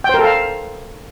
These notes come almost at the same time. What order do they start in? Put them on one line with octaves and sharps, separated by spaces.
G5 C5 A#4 A4 F5